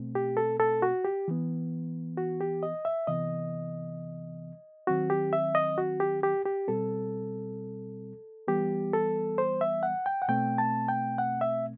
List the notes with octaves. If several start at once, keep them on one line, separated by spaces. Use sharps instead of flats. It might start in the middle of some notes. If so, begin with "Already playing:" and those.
Already playing: B2 A3 C4
G4
A4
A4
F#4
G4
E3 B3
F#4
G4
D#5
E5
C3 E3 B3 D#5
D#3 F#3 C4 F#4
G4
E5
D#5
F#4
G4
G4
G4
B2 G3 C4 A4
E3 G3 B3 G4
A4
C5
E5
F#5
G5
F#5
B2 A3 C4 G5
A5
G5
F#5
E5